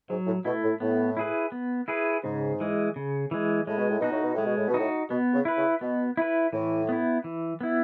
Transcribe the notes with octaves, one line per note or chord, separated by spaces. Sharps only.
G#2 F#3
A2
B2 A3 E4
A2
A2 B3
E4 G#4 B4
B3
E4 G#4 B4
G#2 C#3
E3 G#3
C#3
E3 G#3
A2 G#3
B2
A2
B2 D#4 F#4
A2
B2
A2 G#3
B2
A2
B2
A2 D#4 F#4
B2 B3
C#3
E4 B4
C#3
B2 B3
E4 B4
A2 E3
B3 E4
E3
B3 E4